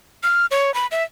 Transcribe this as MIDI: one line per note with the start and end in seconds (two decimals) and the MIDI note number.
0.23 0.46 89
0.51 0.74 73
0.74 0.86 83
0.91 1.03 76